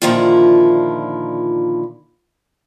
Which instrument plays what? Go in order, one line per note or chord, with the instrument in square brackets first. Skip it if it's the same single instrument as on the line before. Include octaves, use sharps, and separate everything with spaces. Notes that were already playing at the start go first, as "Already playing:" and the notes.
[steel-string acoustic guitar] A#2 D3 D#3 F3 E4 F4